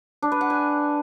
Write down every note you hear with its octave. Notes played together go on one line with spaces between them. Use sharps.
D4
B4
F#5
G#5